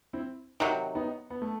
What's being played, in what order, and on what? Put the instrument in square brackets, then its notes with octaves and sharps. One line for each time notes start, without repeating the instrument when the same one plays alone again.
[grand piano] C4 E4
[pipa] C3 D#3 F#3 [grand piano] D#4 F#4
[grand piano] B3 D#4
B3
A3